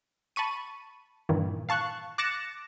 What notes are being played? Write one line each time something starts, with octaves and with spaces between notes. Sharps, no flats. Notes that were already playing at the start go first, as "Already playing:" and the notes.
A5 B5 C#6 D#7
G2 A#2 D#3 E3
F5 A5 C#6 F#6
D6 F#6 A6 A#6 C#7 E7